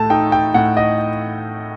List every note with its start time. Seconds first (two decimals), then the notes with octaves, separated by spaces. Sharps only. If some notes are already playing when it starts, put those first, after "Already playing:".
Already playing: A2 A3 A5
0.10 D#4 G5
0.32 G5
0.54 A2 F#5
0.77 D#5